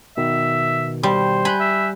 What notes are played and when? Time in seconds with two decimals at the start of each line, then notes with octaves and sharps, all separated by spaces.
0.17 B2 D#3 E5
1.03 G3 C5
1.45 G#5 B5 F#6 G6
1.60 E5